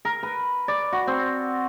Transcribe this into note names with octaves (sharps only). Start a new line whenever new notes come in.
A#4
B4
D5
F#4
C4